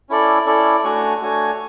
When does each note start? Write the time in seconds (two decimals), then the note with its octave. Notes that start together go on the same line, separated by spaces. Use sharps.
0.09 C#4 E4 A4 D5
0.46 C#4 E4 A4 D5
0.84 A3 D4 F#4 C#5 G#5
1.21 A3 D4 F#4 C#5 G#5